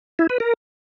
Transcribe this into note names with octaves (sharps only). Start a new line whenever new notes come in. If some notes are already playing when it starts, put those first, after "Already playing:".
E4
B4
A#4